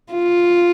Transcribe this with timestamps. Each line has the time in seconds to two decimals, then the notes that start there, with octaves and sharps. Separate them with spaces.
0.13 F4